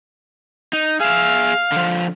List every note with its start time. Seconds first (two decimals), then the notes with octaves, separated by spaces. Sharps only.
0.73 D#4
1.00 G#4 E5 F5
1.72 D3 F3